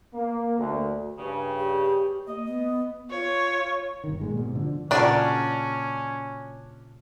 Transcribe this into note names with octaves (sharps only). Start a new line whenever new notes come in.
A#3
D2
G2 C#3
G4
A#3 D#5
B3
F4 C#5
G1 D#3
A#2 G#3
G#2 B2
D3 F3
A#2 C#3 F#3 C#4 D4 F#4 A#4 D5